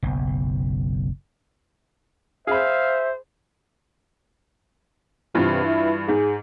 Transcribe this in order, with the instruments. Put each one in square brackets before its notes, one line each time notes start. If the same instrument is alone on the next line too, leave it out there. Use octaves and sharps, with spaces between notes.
[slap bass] F#1 B1
[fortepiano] G#4 B5 [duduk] C5 [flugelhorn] E5 [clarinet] F5
[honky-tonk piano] G2 E3 F4 [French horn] C3
[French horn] E4
[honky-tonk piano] G#2 [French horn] G#4